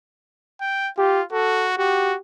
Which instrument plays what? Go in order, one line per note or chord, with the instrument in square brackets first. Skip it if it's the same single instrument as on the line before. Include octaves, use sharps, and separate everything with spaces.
[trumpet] G5
[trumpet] F4 [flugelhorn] G4
[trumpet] F#4 [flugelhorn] A4
[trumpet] F#4 [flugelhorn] G4